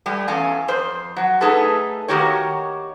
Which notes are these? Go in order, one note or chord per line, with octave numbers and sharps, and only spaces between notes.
G3 A3
E2 C#4 A4 F5 G#5
F2 C5
F#3
A3 D#4 G#4 A4 B4
D#3 A#3 F#4 G4 C#5